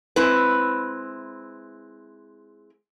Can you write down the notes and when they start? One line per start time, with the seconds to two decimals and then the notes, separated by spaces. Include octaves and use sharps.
0.16 G#3 C4 E4 B4